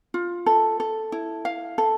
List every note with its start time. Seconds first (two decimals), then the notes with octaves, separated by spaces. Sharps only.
0.14 F4
0.46 A4
0.80 A4
1.12 E4
1.45 F5
1.78 A4